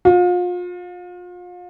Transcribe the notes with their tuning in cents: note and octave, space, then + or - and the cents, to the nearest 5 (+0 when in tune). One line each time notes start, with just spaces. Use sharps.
F4 +35